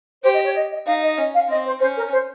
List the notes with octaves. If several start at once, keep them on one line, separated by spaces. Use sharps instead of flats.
G4 C5
D#5
C#5
D#5
D#5
D#4 F5
D#5
C#4 D#5
F5
C4 D#5
C5
C#4 C5
A#4
C5